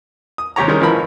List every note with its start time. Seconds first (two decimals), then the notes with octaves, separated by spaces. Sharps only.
0.38 D#6
0.56 D#2 C3 G4 C#5 A#5
0.68 D#3 G3 G#3 C#4 A#4
0.81 G#1 E3 F3 A#4 B5